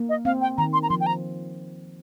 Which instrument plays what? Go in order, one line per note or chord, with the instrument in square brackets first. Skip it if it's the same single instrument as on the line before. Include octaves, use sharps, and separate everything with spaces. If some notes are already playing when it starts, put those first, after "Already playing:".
Already playing: [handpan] A#3
[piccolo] D#5
[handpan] C4 [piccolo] F5
[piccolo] G5
[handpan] D#3 [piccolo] A#5
[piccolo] C6
A#5
[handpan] F3 [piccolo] C6
[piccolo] G5
A#5